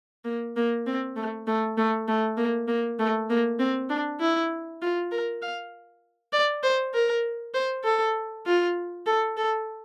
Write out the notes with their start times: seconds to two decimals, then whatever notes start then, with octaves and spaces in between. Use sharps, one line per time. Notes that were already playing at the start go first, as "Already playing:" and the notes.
0.25 A#3
0.56 A#3
0.87 C4
1.16 A3
1.47 A3
1.78 A3
2.08 A3
2.37 A#3
2.68 A#3
2.99 A3
3.30 A#3
3.59 C4
3.89 D4
4.21 E4
4.82 F4
5.12 A#4
5.42 F5
6.33 D5
6.63 C5
6.94 A#4
7.54 C5
7.84 A4
8.46 F4
9.07 A4
9.37 A4